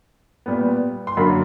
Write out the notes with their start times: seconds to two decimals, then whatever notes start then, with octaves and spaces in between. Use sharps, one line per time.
0.46 A#2 G3 B3
1.07 C6
1.17 F#2 D3 F#3 A#3 B5